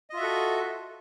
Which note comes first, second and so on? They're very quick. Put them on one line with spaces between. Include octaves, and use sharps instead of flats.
D#5 F4 E5 F#4 A4